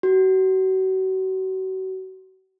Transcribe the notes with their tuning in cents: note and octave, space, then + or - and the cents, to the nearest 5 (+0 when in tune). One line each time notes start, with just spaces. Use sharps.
F#4 +35